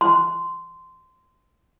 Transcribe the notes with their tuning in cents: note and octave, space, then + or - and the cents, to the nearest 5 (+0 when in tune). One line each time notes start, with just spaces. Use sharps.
C6 -15